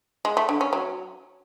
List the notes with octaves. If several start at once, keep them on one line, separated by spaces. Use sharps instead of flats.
G#3
A3
D3
C#4
F#3